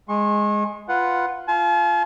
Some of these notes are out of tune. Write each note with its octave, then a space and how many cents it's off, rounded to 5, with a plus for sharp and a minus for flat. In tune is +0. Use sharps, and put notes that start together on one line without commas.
G#3 +0 C#6 -40
F4 +0 B4 +0 F#5 +0
F4 -10 A5 -45